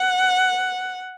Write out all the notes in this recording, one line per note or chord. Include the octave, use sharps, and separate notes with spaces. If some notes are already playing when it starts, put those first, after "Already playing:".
Already playing: F#5